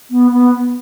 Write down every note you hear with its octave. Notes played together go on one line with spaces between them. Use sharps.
B3
B3